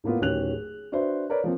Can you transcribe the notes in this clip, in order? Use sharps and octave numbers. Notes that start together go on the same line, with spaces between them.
A2 A#3 B3 F4
D1 D#3 C#4 G4 F#6 F7
G#4
D4 F#4 B4 C5 E5
A#4 B4 C#5 D5
F3 A#3 C4